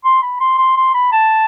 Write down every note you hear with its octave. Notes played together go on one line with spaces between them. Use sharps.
C6
B5
C6
C6
C6
B5
A5